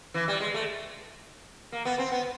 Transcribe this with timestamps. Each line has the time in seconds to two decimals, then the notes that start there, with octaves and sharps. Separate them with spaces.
0.14 E3
0.28 G3
0.40 G#3
0.54 A3
1.72 A#3
1.85 B3
1.98 C4
2.12 B3